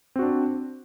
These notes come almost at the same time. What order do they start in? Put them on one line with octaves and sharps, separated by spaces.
C4 F#4 D4